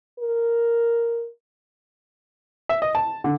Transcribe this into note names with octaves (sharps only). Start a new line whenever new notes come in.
A#4
E5
D#5
A5
D3